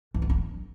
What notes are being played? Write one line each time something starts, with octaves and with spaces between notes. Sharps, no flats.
E3
A3
D4